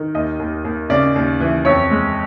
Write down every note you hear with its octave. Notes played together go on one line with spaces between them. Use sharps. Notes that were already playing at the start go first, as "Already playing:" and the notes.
Already playing: D#3
D#2 D#5
D#2
D#2
C#3 D5
D#2
E3
F2 C#5
G#3